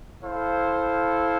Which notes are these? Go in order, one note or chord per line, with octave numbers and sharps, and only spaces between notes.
E4 A4 C5 F5